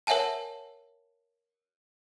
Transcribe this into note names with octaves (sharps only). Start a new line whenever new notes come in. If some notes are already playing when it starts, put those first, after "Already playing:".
A#4 C#5 E5 F#5 G#5 A5